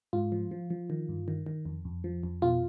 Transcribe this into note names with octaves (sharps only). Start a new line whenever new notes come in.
G#2 F4
F3
F3
F3
D#3
G2
D#3
D#3
F2
F2
F3
F2
B2 F4